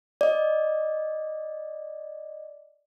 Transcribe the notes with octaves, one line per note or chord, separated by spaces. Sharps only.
D5 D#5